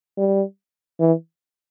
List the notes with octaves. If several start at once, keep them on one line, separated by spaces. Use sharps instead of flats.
G3
E3